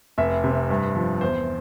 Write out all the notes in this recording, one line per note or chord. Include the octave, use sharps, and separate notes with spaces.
F1 E5
C3
G2
F3
E2 C5